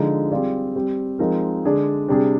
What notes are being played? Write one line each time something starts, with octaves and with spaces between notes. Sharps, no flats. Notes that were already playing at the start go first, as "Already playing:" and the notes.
Already playing: D3 F3 G#3 D#4
G3 C4 F4 G#4 D5
G3 C4 G4
F3 G#3 C4 D#4 A#4
D3 G#3 D4 G#4 D5
C3 G3 D4 G#4